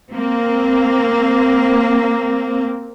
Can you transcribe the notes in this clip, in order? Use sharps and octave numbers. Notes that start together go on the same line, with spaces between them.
A#3 C4